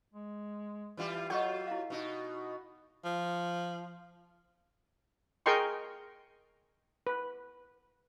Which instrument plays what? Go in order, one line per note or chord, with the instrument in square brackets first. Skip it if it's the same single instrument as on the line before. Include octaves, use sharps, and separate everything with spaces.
[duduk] G#3
[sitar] E3 G3 F4
[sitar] F#3 F4 [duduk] F#4 [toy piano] A4 D#5 [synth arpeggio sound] F#5 C#6 G6
[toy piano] E4 F5
[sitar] B2 D#4 [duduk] F#4
[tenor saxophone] F3
[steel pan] G#4 A#4 D#5 G5 C6 C#6
B4